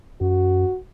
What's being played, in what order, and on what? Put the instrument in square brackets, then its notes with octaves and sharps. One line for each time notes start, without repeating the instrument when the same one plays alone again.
[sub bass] F#2 [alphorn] F#4